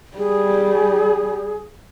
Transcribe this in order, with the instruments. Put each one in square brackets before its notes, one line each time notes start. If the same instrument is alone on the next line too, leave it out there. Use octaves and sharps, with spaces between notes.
[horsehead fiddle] G3 [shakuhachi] G#4